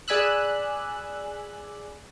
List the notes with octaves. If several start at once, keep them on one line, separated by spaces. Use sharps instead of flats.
G#4 D5 G#5 B5 E6 F#6